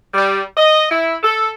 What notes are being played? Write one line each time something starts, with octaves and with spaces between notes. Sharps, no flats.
G3
D#5
E4
A4